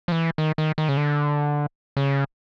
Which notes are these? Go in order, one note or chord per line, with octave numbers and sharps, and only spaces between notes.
F3
E3
D#3
D#3
D#3
C#3
D3
C#3